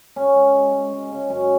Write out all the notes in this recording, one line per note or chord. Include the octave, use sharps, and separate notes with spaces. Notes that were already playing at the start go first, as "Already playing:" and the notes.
C#3 C#4
G#3
G#3
G#3
G#3
C#3
F#2 C#4